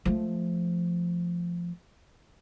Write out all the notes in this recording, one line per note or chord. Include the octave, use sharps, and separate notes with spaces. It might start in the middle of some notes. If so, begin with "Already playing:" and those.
F3 A3